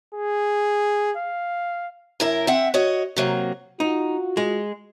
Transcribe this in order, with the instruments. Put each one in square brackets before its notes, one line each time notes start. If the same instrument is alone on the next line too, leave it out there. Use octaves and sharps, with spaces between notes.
[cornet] G#4
F5
[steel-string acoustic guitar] F#2 E4 A#4
C4 E5 F#5
F#4 C#5 D#5
C3 F#3 A#3
[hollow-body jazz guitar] D#4 [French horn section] F4 F#4
[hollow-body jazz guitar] G#3